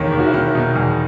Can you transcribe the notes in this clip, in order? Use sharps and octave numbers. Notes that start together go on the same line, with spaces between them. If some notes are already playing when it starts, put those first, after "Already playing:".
Already playing: E1 D#2 D#3 C#5
D#2
F#4
E4
D#3
B2 D#4
E2